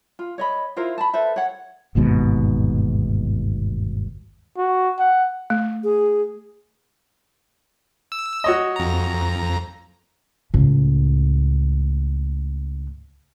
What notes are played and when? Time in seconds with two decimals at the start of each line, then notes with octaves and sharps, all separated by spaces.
0.19 F4
0.38 C#5 D#5 B5
0.76 E4 F4 A#4 C5
0.98 A5 B5
1.14 A4 B4 C5 E5
1.36 C#5 F#5
1.95 G1 D#2 G#2 B2
4.57 F#4
4.99 F#5
5.50 A3
5.84 G#4
8.12 E6
8.44 F#4 C#5 D#5
8.76 F2 A#5
10.54 C#2 A2